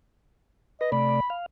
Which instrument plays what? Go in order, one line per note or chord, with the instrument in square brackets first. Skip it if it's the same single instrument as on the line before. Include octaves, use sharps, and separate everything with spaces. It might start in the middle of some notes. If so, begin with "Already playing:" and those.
[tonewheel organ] B4 [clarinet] D#5
[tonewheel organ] C3 A3 D5 [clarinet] B5
[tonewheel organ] F5